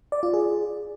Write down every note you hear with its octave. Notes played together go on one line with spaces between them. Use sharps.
D5
F4
G#4